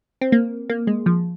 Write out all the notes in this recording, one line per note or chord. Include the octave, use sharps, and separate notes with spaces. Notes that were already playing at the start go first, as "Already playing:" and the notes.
C4
A#3
A#3
G#3
F3